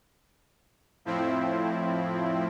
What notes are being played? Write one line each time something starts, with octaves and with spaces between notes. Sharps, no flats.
F2 A2 F3 C4 E4